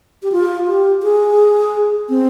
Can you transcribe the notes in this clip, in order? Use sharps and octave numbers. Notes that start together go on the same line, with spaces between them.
G4
F4
G4
G#4
C4